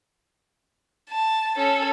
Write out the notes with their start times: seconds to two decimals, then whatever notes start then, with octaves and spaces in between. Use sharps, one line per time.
1.10 A5
1.56 C#4 A4